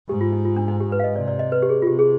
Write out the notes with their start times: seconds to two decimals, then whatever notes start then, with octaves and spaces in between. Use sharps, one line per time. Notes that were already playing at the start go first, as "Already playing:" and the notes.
0.09 G#2 G4
0.21 F4
0.33 D#4
0.45 F4
0.56 D4
0.68 D#4
0.80 G4
0.92 B4
0.99 F5
1.04 D#5
1.16 C3 D5
1.28 D5
1.39 D#5
1.52 B4
1.62 G4
1.69 G#4
1.82 F4
1.87 C3 G4
1.99 G#4